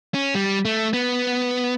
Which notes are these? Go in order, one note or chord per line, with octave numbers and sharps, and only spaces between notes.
C#4
G3
A3
B3